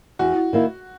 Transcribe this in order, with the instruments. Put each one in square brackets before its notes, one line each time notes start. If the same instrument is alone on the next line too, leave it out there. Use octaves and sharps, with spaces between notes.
[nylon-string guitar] E2 [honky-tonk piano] F#4
[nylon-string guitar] D#3 A#3 E4